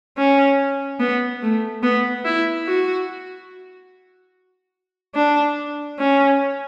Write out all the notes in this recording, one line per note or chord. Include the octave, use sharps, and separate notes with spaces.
C#4
B3
A3
B3
E4
F#4
D4
C#4